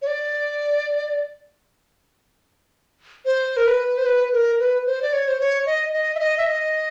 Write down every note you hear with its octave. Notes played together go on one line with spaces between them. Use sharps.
C#5
D5
C5
A#4
B4
C5
B4
A#4
B4
C5
D5
C#5
C5
C#5
D#5
D#5
E5
D#5
E5
D#5